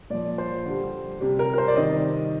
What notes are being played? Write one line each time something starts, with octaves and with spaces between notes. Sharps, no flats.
A#2 F3 D5
C5
D3 G3
C3 G3
A#4
A#4
C5
D5
C3 D#3 G3 D#5